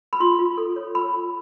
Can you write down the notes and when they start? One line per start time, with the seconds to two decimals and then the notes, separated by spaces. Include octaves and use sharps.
0.13 B5
0.20 F4 C6
0.39 F4
0.57 A4
0.76 C#5
0.95 F4 B5
1.14 F4